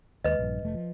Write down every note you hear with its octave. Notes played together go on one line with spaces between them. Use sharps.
D#2 G#3 B4 D#5
A#1 G2
F1 A3
F3